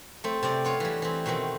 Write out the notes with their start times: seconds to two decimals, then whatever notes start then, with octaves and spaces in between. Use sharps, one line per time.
0.24 A3 C4
0.43 C3 C4 D5
0.65 B3 F4 C#5
0.80 E3 G3
1.02 E3 C4
1.26 B2 D#3 A3 C4